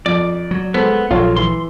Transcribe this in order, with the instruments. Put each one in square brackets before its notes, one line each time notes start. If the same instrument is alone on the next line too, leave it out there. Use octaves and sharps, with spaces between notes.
[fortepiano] F2 [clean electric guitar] D5
[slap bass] F#3
[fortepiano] G#3 A4 C5 [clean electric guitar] B3
[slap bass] A#1 F#3 [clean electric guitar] F4 [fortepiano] A4 C#5 F5
[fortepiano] E3 [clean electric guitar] C6